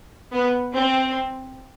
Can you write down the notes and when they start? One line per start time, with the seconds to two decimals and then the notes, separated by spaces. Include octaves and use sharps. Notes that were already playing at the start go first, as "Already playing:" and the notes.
0.33 B3
0.74 C4